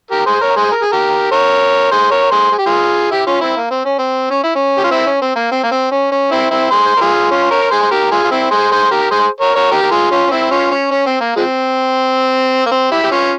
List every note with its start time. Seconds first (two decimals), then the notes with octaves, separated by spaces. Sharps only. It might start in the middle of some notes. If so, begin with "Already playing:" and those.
0.11 G4 A#4
0.26 G#4 C5
0.41 A#4 C#5
0.56 G#4 C5
0.72 A#4
0.82 G#4
0.92 G4 A#4
1.31 A#4 C#5
1.91 G#4 C5
2.11 A#4 C#5
2.31 G#4 C5
2.51 G#4
2.58 G4
2.66 F4 G#4
3.11 E4 G4
3.27 C#4 F4
3.41 C4 E4
3.57 A#3
3.71 C4
3.85 C#4
3.99 C4
4.31 C#4
4.44 E4
4.55 C#4
4.78 G4
4.84 F4
4.91 C4 E4
5.07 C#4
5.22 C4
5.36 A#3
5.51 C4
5.63 A#3
5.71 C4
5.91 C#4
6.12 C#4
6.31 C4 E4
6.51 C4 E4
6.71 G#4 C5
6.96 A#4
7.01 F4 G#4
7.31 C#4 F4
7.51 A#4 C#5
7.71 G#4 C5
7.82 C5
7.91 G4 A#4
8.11 F4 G#4
8.24 F4
8.31 C4 E4
8.51 G#4 C5
8.71 G#4 C5
8.91 G4 A#4
9.11 G#4 C5
9.41 A#4 C#5
9.56 A#4 C#5
9.71 G4 A#4
9.82 A#4
9.91 F4 G#4
10.11 C#4 F4
10.27 C#4
10.31 C4 E4
10.51 C#4 F4
10.71 C#4
10.91 C#4
11.06 C4
11.21 A#3
11.37 F3 G#3 C4
12.66 A#3
12.71 C4
12.91 E4 G4
13.04 G4
13.12 C#4 F4